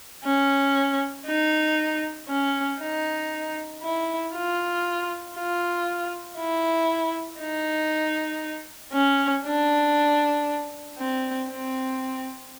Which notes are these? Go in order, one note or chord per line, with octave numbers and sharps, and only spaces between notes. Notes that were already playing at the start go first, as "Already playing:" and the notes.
C#4
D#4
C#4
D#4
E4
F4
F4
E4
D#4
C#4
D4
C4
C4